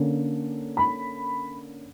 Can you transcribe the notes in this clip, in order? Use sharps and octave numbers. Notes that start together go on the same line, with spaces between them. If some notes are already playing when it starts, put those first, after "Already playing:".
Already playing: D3 A#3 C#4
B5